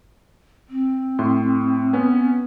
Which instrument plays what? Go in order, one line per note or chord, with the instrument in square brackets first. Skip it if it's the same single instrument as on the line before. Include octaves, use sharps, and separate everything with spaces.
[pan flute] C4
[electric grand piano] A2 C6
B3 C#4